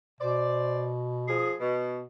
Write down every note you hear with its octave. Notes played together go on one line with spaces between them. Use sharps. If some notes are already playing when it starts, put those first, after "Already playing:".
B2 C5 D5
F3 G#4
B2